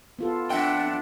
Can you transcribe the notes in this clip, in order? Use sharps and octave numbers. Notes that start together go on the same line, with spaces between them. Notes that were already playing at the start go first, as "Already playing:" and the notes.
B3 F4 A4
F2 D4 E5 F#5 G5